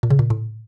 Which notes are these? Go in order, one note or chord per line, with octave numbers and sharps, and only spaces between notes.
A#2
C#3
A#2
A2